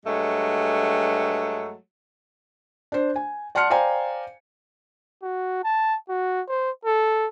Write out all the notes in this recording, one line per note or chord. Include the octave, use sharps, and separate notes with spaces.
G2 F#3 G#3 A3
D4 C5
G#5
D5 F#5 A5 C6 F6 C#7
C5 D5 F5 G5 G#5 A#5
F#4
A5
F#4
C5
A4